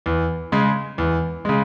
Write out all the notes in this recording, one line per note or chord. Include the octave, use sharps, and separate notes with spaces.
E2
C#3 G#3
E2
C#3 G#3